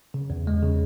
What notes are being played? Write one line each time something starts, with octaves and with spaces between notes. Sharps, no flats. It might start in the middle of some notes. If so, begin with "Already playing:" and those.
C#3
E2
G#3
C#3